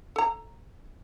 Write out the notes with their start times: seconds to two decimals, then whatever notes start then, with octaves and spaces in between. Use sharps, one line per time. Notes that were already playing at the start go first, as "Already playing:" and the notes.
0.16 A4 A#5